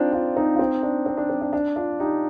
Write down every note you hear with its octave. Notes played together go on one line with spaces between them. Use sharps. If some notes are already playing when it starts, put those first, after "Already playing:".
Already playing: C4 D4 D#4 F4
D4 F4
C4 D#4
F4
C4 D#4
D4
C4
D4
C4
D4
D4
D4 F4
D#4 G4